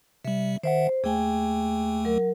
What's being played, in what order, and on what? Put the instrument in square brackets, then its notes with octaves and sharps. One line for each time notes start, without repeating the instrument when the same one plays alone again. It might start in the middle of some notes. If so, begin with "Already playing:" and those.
[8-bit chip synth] C3 G3 [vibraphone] E5
[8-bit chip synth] D#3 E5 F#5 [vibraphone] C5
[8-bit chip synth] D#2 A3 [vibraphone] G#4 G5 G#5
[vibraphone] F#3 A#4